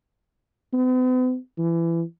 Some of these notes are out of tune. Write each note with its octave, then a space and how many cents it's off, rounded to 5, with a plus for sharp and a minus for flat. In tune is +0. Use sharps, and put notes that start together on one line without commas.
B3 +45
E3 +25